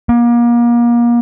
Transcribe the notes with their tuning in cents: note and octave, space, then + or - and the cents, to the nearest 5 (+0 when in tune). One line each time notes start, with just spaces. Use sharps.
A#3 +35